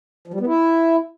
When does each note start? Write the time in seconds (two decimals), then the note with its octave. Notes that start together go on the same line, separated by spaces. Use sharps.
0.27 F3
0.34 G3
0.40 B3
0.47 E4